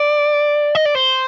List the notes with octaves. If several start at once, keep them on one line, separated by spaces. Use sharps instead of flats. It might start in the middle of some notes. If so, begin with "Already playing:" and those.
Already playing: D5
D#5
D5
C5